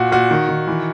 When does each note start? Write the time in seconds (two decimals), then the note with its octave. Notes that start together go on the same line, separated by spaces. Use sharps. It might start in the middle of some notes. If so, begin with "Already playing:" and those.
Already playing: A#2 F#4
0.12 A#2 F#4
0.31 D#3
0.49 D#3
0.67 E3